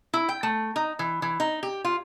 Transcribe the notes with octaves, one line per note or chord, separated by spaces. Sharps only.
E4
G5
A3
D#4
E3
E3
D#4
G4
F4